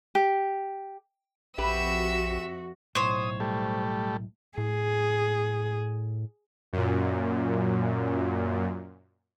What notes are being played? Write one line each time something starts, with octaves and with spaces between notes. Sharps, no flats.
G4
A#1 F2 F#4 G4 B4 E5 E6
B1 A2 C5 C#5 D#6
G3 A3
A2 G#4
F#2 A#2